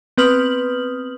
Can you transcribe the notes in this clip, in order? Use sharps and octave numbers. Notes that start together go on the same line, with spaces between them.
B3 C4 B4 D#6 F6 F#7